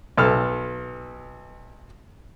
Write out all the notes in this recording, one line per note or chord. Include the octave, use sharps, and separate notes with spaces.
B1 A4 F6